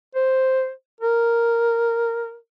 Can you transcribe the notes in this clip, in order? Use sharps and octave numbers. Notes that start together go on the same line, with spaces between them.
C5
A#4